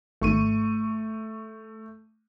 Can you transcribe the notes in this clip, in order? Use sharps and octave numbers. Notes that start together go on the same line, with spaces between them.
G#1 A3 C#6 D#7